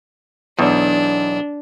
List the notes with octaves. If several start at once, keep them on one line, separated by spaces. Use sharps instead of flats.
B1 E2 D4